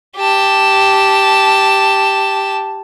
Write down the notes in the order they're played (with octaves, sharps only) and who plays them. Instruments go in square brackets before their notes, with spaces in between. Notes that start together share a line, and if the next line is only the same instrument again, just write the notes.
[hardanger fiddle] G4 A5